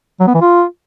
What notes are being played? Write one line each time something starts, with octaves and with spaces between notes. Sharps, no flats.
F#3
B3
E3
F4